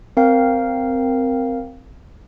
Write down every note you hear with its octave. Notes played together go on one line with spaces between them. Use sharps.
C4 A#4 F5 G5